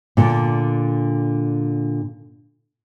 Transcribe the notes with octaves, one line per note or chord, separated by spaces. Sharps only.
A#2 D3